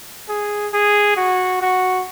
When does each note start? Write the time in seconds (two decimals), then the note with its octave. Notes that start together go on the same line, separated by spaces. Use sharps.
0.29 G#4
0.73 G#4
1.17 F#4
1.61 F#4